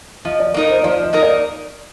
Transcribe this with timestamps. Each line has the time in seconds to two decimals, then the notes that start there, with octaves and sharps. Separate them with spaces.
0.25 F3 D#5
0.40 D5
0.54 A#3 D#4 A#4 D#5
0.70 C5
0.83 F3 D5
1.03 D#5
1.13 A#3 D#4 A#4
1.22 D5